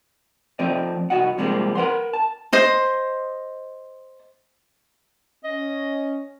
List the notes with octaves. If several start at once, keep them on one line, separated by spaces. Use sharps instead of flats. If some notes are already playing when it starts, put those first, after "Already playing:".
F3 A3 C4 D5 D#5
C2 F#4 D#5 F#5
C3 F3 G3 G#3 A#3 C4
A#4 B4 F#5 C6
A5
C5 D#5 C6
C#4 D#5